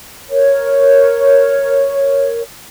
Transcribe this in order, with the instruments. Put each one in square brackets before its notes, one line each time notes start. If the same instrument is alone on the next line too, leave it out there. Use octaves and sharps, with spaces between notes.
[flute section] A#4 C#5